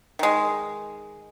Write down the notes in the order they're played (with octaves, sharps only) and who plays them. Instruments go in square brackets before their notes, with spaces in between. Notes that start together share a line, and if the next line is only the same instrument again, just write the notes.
[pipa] D#3 G#3